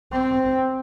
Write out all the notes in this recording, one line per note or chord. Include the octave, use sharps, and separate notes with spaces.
C4